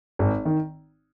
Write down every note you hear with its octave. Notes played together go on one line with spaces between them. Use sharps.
G#1
D#3